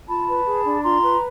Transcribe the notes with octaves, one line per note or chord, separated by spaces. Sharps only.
F4 A5 B5
B4
G#4
D4
F4 A#5 C6
B4